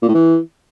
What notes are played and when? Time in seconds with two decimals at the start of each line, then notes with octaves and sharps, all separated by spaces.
0.02 A#2
0.08 A2
0.14 E3